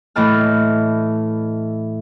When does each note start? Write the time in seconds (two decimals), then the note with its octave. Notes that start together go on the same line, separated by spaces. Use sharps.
0.16 A2 E3 D#5 A5 F6